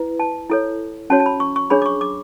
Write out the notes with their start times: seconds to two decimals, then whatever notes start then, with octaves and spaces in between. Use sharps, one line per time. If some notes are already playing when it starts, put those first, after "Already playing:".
Already playing: E4 B4
0.20 A5
0.50 E4 A4 C#5
1.10 C#4 F#4 C#5 A5
1.20 A5
1.26 B5
1.40 C#6
1.56 C#6
1.70 D4 G#4 C#5 B5
1.82 D6
1.86 C#6
2.01 D6